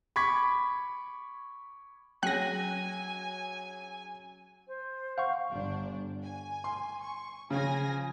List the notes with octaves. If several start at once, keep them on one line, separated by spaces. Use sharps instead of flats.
B5 C#6 D6 G#6 B6
F#3 C#4 G#4 G5 G#5 F#6 A#6
C5
F5 F#5 C#6
G1 D4
G#5
C6
C#6
C#3 F3 G#5 A#6